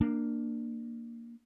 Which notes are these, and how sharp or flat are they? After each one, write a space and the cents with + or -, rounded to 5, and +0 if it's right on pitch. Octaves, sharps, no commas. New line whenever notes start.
A#3 +0 D4 +20